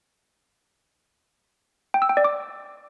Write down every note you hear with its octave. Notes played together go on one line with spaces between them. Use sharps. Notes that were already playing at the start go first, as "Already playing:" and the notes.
G5
E6
G5
D5
D6